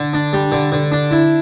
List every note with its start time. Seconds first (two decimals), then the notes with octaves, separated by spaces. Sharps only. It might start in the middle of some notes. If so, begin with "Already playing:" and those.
Already playing: D3
0.13 D4
0.33 G3
0.52 D3
0.72 D3
0.92 D4
1.11 E4